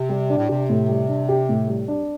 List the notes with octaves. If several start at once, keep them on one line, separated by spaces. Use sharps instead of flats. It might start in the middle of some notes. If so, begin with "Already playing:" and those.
Already playing: C3
G3
D4
A2
C3 G4
A2
G3
D4
G4
A2
G3
D4